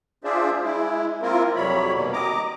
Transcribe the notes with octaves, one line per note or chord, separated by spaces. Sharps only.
D4 F4 G#4 C5 D5 E5
G#3 E4
A#3 C4 E4 F4 A#4
F2 C3 F#3 G3 C#5 B5
B2 D#3 G3 A#3
D#5 A#5 D6